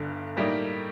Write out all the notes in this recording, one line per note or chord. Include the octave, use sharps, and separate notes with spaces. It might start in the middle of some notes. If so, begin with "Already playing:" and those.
Already playing: G1 G2 D3
A2 G3 A#3 D#4